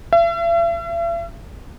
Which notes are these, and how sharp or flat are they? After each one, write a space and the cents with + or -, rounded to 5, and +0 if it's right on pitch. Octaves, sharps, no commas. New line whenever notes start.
E5 +45